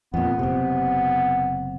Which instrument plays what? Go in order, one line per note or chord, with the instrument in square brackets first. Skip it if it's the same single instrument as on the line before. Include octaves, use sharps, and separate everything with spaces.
[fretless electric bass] F2 A#2 [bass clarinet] B3
[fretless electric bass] F#1 C3